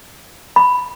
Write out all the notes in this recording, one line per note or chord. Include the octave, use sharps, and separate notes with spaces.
B5